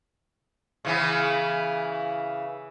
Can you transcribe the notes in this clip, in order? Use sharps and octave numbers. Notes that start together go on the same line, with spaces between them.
C#3 E3 B3